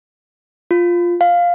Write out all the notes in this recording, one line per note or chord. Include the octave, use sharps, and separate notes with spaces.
F4
F5